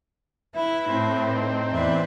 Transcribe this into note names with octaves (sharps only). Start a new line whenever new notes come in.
E4 B4 E5
A2 C4
D#4
E2 E3 B4 D5 E5